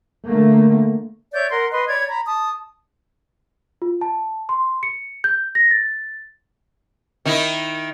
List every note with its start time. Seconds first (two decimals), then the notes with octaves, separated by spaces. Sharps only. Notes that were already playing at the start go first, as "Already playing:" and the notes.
0.29 D3 A3 A#3
1.33 C#5 D5 E5 G6
1.51 A#4 F#5 C6
1.71 B4 D#5 C6
1.88 C#5 D5 B5 G#6
2.08 A#5 B5
2.26 A5 D#6
3.82 F4
4.01 A5
4.49 C6
4.83 C#7
5.24 G6
5.55 A#6
5.71 A6
7.25 D#3 D#4 E4